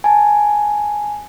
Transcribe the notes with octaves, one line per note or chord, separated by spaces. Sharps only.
G#5 A5